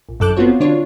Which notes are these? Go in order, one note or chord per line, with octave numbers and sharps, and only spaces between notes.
A#1
G1 F#2 A4 D6 F#6 G6
B3 C4 F4 F#4 C#5
D3 D4 F4 C#5